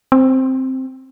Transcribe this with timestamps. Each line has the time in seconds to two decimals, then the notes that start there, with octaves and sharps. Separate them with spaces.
0.12 C4